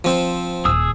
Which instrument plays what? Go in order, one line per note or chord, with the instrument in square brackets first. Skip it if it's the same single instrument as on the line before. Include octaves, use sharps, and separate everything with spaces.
[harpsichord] F3 C4
[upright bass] D#1 [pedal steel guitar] G#4 D#6 E6